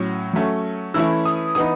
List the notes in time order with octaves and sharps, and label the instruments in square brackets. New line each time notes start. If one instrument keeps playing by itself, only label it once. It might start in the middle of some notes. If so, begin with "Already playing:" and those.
Already playing: [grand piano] A2 F#3 C#4
F#3 A3 C#4
E3 A3 C#4 E4 E6
D#6
E3 B3 D#4 D#6